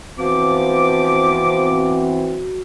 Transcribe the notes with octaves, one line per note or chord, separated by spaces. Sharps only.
E3 F3 B3 C4 F#4 D6